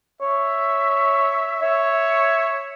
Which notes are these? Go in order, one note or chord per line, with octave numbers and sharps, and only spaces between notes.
C#5 E5
C#5 E5